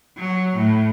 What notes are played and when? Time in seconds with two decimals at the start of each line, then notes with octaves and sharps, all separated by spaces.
0.17 F#3
0.56 A2